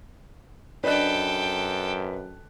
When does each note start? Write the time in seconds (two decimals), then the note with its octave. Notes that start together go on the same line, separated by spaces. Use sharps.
0.84 F#2 D4 A4 B4 D5 D#5 G5 F#6